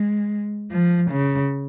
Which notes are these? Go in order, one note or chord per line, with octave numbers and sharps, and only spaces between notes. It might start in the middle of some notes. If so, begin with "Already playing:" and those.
Already playing: G#3
F3
C#3